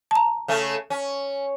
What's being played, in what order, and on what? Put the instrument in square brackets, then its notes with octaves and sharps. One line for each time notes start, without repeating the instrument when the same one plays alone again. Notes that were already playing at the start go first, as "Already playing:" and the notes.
[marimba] A5 A#5
[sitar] C#3 A3 C#4
C#4